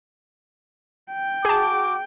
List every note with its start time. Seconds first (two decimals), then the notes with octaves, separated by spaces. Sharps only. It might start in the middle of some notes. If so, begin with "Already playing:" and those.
1.12 G5
1.45 F#4 G#4 A5 D6